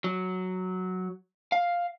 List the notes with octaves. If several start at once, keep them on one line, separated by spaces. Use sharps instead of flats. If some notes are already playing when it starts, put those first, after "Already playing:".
F#3
F5